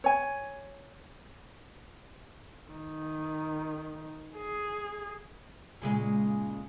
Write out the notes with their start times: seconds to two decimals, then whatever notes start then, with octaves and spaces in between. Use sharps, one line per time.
0.04 C#5 G#5
2.72 D#3
4.36 G#4
5.82 A#2 C#3 G#3